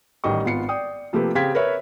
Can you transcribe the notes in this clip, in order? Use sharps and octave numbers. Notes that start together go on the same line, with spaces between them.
A1 D#3 G3 D#5 C#6
G#1 B3 F4 C7 C#7
D5 G5 D#6
C3 F3 A3 A#3 G4 B4
C#3 C4 G4 F5 G#6 B6
A#4 B4 C#5 E5